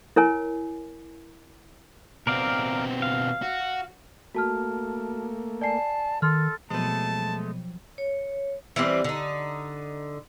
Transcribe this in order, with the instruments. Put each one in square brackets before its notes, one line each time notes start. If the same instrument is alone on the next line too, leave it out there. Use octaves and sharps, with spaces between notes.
[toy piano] E4 A#4 C#5 G#5
[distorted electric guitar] B2 C4 [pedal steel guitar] A#4 D5 F5
[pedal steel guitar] F5
[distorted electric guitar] F#4
[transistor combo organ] A3 A#3 [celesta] F#4 A5 F6
[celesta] D5 G#5 C7 [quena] A5
[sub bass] D#3 [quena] A4 [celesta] C6 F6
[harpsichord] B2 B3 [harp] F3 F#3 C4 [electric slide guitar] G#3 A3 [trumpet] A5
[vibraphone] C#5
[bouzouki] E3 G3 C4
D3 D#4